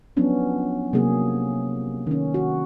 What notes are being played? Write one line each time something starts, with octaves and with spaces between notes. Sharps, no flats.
F3 F#3 B3 C#4 D4
C3 F#3 A#3 G#4
D#3 C#4
F#4